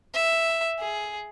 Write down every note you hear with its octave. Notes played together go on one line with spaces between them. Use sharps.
E5
G#4